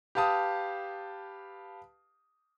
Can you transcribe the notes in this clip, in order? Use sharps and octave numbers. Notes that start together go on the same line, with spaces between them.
G4 B4 F5 A5 D#6